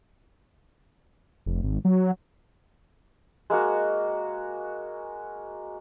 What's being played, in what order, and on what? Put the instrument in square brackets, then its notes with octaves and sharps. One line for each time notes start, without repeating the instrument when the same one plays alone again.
[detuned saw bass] F1
G#1
F#3
[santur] G#3 A#3 F#4